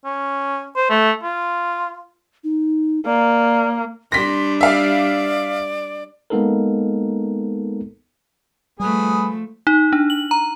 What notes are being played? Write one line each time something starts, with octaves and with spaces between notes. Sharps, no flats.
C#4
C5
A3
F4
D#4
A#3 D5
G3 D4 C6 A#6 B6
D5 E5 F5
G#3 A#3 B3 D#4 A4 A#4
F3 G3 A3 G#4 B4
D#4
D4
F#7
A#5